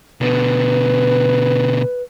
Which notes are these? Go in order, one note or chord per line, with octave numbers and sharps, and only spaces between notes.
B2 D3 B4